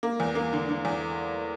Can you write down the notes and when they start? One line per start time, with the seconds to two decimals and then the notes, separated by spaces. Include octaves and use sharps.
0.03 A#3
0.20 E2
0.35 A#3
0.53 D3
0.69 D3
0.85 E2